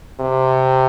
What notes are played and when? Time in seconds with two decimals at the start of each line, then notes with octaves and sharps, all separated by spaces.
0.20 C3